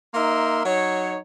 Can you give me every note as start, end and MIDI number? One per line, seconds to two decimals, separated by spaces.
0.14 0.63 58
0.14 0.63 63
0.14 0.63 70
0.14 0.63 76
0.14 0.63 84
0.65 1.17 54
0.65 1.17 63
0.65 1.17 73